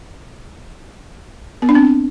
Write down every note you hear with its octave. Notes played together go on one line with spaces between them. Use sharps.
B3
D4
C4